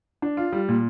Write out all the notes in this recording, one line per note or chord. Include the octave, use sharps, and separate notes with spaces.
D4
F4
G3
A#2